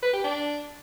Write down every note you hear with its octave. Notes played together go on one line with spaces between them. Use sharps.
B4
G4
D4